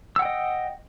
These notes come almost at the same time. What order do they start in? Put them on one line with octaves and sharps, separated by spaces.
E6 F#5 G5 D#5